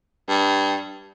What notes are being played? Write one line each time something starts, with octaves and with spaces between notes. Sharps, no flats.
G2